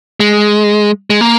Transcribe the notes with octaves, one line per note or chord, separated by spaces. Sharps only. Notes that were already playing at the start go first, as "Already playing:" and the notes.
G#3
G#3
A#3